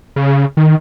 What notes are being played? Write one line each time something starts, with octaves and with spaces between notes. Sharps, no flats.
C#3
D#3